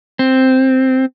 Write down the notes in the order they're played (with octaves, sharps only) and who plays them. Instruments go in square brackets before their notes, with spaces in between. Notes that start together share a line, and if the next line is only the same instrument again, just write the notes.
[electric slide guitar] C4